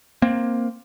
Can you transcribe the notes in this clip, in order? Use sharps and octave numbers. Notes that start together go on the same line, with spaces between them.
A#3 C4